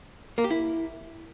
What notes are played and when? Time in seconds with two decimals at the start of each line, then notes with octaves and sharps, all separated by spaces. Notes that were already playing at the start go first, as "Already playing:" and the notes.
0.38 A#3
0.44 G4
0.51 E4